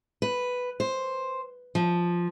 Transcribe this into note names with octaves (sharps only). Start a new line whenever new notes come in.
B4
C5
F3